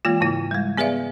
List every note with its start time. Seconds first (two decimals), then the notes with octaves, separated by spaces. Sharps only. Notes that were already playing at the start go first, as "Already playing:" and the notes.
0.05 E3 G#3 A#3 F4
0.21 G#2 C#3 A#3 E4
0.51 G3 G#3
0.78 B3 G#4 B4 D5 E5 F5